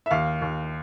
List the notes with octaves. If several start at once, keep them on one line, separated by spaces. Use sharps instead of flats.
E5
D#2 F5
D#2